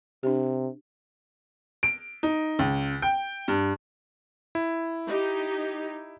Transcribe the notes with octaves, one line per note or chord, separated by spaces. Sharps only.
C3 D4 G4
D7
D#4
C#2
G5
G2
E4
D#4 G4